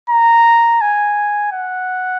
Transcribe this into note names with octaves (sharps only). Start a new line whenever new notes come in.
A#5
G#5
F#5